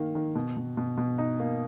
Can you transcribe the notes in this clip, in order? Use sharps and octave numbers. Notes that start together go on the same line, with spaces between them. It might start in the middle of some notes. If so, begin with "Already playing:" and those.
Already playing: D#3 A#3
D#3
B2
B2
B2
B2
D#4
A#3